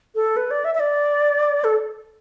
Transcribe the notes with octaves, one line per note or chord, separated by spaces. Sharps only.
A4
B4
D5
E5
E5
D5
A4